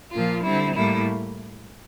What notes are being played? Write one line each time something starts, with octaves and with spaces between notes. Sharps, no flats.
A#2 F3 A#3 F4
D3 G3 C4 E4
A2 G3 A#3 E4